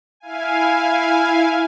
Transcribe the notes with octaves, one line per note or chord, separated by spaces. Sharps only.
E4 F5 G#5